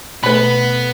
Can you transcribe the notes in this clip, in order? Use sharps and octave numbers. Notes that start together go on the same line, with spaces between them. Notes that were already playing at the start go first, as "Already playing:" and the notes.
B2 A3 B3 B4 B5